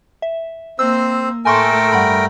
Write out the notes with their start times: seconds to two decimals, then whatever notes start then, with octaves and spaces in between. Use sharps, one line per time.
0.22 E5
0.79 A#3 C4 C5 E6
1.45 A2 A3 A4 A#4 G5 G#5 C6 C#6
1.93 G2 F#5 B5